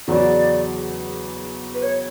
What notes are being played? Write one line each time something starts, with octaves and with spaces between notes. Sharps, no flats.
E2 C#3 F#3 D5
B4
C#5